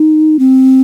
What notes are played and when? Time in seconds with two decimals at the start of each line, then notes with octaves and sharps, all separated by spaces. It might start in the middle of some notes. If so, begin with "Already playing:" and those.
Already playing: D#4
0.39 C4